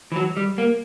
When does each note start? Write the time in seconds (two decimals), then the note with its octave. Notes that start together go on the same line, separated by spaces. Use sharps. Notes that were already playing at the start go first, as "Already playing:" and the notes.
0.12 E3
0.16 F#3
0.37 G3
0.58 A#3